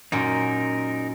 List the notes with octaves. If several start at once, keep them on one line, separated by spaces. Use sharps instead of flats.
F#2 A#2 D#4 A#4